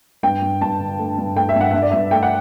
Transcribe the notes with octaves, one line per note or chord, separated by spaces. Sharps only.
G2 G5
G2
G2 A5
D3
A3
G2
A3 G5
E5
G2
F#5
G2 E5
D5
G2 E5
A3 G5
F#5